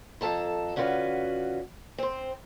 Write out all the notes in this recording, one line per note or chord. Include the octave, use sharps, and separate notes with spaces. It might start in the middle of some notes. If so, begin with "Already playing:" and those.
F2 C#3 A4 A5 A#5
D3 C#4 F4 F#4 B4
C4 C5